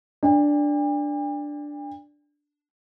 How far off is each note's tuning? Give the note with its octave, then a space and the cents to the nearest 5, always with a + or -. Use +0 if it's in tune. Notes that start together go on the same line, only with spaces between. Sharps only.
D4 +0 G5 +45